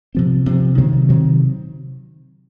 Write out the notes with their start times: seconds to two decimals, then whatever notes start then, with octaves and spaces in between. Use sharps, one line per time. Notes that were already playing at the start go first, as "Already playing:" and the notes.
0.15 C3 F3 C4
0.46 C3 F3 C4
0.78 C3 D#3 F#3 C4
1.09 C3 D#3 F#3 C4